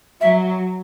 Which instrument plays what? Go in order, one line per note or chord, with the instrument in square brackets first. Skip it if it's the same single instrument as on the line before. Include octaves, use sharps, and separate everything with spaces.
[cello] F#3 [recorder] E5